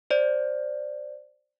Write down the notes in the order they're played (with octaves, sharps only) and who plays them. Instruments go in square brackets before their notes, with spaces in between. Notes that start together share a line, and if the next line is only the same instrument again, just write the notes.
[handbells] C5 D5